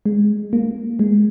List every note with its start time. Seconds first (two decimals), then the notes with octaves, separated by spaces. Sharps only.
0.06 G#3
0.53 A#3
0.99 G#3